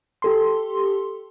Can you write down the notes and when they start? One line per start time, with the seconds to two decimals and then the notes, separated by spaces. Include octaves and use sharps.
0.22 G4 A4 C6